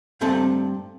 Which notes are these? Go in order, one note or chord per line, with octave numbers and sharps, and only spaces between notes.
G2 A3 C4 A4 A5